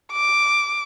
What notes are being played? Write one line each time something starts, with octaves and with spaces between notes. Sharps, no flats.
D6